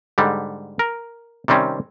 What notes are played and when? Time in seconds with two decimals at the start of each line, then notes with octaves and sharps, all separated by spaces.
0.18 G#2 D3 G3
0.79 A#4
1.48 C3 D#3 G3 C4 C#4